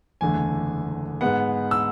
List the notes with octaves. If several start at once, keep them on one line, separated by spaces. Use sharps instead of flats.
F#1 E2 D3 A3 G#5
G#2 G#3 B3 F#5
E6